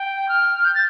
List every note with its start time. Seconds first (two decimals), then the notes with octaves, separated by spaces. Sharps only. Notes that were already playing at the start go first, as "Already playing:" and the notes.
Already playing: G5
0.29 F6
0.65 G6
0.75 A6